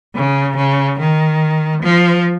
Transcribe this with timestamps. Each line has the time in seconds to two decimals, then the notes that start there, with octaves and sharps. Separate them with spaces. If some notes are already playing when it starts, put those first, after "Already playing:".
0.16 C#3
0.56 C#3
0.99 D#3
1.83 F3